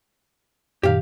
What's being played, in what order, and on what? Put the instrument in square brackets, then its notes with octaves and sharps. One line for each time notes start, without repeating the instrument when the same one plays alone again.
[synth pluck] F#2 A#2 D#3 [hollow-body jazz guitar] G4 F5